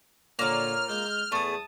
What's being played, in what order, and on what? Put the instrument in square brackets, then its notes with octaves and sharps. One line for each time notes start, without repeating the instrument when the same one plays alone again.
[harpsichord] A#2 D3 [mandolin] A#3 F4 [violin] C#5 [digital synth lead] F6
[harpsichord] G#3 [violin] G6
[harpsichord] E2 G#4 [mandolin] A3 [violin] A5 D#6